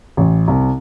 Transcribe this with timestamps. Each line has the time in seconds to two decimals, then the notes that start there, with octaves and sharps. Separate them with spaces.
0.17 A1
0.48 C2